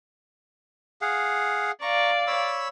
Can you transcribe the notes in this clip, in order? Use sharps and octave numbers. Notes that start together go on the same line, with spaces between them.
G#4 F5 F#5
D5 F5 A#5 C#6
C#5 B5 E6